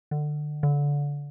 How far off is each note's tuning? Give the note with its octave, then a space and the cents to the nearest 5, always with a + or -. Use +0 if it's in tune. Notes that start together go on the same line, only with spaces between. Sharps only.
D3 +25
D3 -25